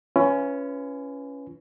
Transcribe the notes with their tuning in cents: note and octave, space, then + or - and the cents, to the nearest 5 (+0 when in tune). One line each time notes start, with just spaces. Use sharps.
C#4 +5 E4 +45 B4 +0